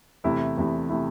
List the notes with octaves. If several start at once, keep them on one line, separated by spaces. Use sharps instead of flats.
E2 C3 A3 E4
E2 C3 A3 E4
C3 A3 E4